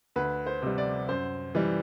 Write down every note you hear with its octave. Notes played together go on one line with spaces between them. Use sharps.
D2 B4
C5
C3 G3
D5
F#2 C5
E3 G3